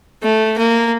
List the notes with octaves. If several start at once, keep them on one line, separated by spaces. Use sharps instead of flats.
A3
A#3